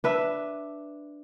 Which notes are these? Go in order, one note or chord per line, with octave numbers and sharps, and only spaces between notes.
D4 B4 E5